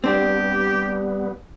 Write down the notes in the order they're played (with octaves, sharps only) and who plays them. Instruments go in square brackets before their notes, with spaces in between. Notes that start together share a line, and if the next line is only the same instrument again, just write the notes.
[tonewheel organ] G3 B3 [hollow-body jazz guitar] C4 D4 [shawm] G4